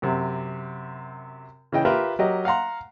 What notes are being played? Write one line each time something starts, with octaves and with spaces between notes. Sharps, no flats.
F#2 C3
C#3 E3 D#5 G5
F4 G4 A#4 B4 E5
F#3 G4 A#4 D#5
F5 F#5 A#5 C6